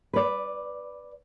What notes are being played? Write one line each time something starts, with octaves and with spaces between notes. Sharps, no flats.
B4 D5